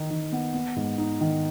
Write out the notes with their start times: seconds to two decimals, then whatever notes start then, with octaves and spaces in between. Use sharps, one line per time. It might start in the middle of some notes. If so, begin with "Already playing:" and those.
Already playing: D#3 D#4
0.10 D#3
0.32 B3
0.54 B3
0.76 G#2
0.98 D#4
1.20 D#3